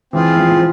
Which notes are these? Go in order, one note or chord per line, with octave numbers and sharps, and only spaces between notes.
E3 C4 F4 G#4
F3
F3